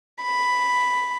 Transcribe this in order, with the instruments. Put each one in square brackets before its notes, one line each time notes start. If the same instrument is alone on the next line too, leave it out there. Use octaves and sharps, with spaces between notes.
[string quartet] B5